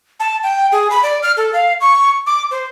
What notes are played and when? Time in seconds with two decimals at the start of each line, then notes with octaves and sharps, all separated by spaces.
0.20 A5
0.43 G5
0.72 G#4
0.91 B5
1.03 D5
1.23 F6
1.37 A4
1.53 F5
1.81 C#6
2.26 D6
2.51 C5